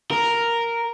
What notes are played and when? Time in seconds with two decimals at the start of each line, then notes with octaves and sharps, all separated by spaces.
0.11 A#4